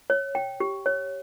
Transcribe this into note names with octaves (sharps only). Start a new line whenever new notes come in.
C#5
G5
G4
C#5